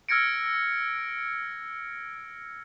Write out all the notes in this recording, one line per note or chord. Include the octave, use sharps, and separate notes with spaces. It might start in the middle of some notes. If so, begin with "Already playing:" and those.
E6 F6 G#6 A#6 C#7 D7